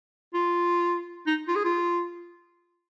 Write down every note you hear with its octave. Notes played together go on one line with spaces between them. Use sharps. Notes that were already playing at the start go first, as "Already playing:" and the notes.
F4
D#4
F4
G#4
F4